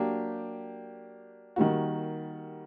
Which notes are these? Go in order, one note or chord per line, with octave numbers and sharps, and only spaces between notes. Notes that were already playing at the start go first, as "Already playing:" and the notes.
Already playing: F#3 A#3 D4 G4
D#3 G3 A#3 F#4